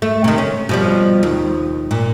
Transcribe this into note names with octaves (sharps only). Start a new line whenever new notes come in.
A3
C3 D#3
C#4
B2 F3 G3
D#2
A#2